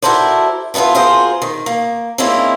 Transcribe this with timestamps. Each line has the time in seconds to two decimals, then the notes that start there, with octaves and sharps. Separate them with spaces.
0.02 E4 F#4 A4 A#4 C5 D5
0.74 A3 B3 D4 E4 F4
0.95 F4 F#4 G#4 A#4 C5
1.42 D#3
1.66 A#3
2.18 D#3 G#3 A#3 C4 C#4 E4